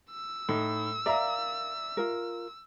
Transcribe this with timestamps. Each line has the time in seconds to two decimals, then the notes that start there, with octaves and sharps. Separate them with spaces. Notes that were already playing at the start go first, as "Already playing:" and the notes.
0.11 E6
0.49 A2 D#4
1.06 A#4 D5 E5 F5 A#5
1.97 F4 A#4